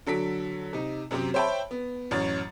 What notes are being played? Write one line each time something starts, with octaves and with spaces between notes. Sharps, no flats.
D3 F#3 A4 B6 D7
C3 D#4
F#2 C3 F#3 C4 G4
C5 C#5 E5 G5 A5 B5
B3
A1 F#2 C#5 F6 A6